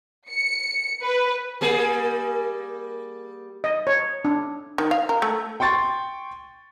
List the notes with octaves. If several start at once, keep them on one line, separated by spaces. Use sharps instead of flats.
C#7
B4
G3 A#3 G#4
D#5
C#5
D4
D#3
F5
A#4
A3
G5 C6 C#6 A6